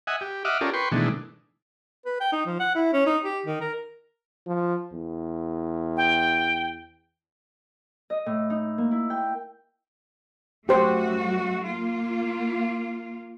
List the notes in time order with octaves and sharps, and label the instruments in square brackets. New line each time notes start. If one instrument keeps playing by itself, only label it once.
[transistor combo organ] D#5 E5 F#5 G#5
G4
D#5 E5 F#5 D6 F6
C#4 F4 G4 A4 A#4 D5
B4 G5 C6 C#6
B2 D#3 E3 G#3 A3 D4
[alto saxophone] B4
G5
D#4
F3
F#5
E4
C#4
D#4
G4
D#3
A#4
[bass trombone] F3
E2
[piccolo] G5
[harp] D#5
A2
D#4
A#3
E4
G5
[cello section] F#2 A3 F#4 [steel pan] G4 C5
[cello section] A#3 F4